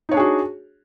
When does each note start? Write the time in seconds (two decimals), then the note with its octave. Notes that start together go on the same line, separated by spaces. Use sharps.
0.09 D#4
0.11 C#5
0.14 D4
0.17 G#4
0.19 F#4